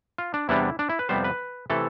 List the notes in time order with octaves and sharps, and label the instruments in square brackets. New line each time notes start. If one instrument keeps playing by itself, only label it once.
[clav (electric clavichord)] F4
D4
E2 C3 G3 B3 D4 E4
D4
E4
B4
F2 C3 G3 B3 C5
B4
C3 E3 A3 A4